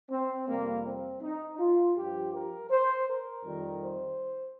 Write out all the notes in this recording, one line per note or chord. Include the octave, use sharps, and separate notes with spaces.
C4
F2 C3 G3 A#3
C4
D#4
F4
G2 F3 G4
A#4
C5
A#4
F2 D#3 G3
C5